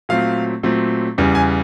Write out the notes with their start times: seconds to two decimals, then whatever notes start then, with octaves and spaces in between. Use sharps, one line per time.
0.09 A#2 F#3 A3 C4 F5
0.63 A#2 F#3 A3 C4
1.18 E2 C#3 E3 G3
1.35 G#5